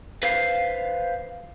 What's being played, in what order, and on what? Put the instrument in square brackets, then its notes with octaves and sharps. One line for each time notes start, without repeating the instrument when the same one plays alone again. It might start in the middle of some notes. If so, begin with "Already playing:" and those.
[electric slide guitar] B4 C5 F5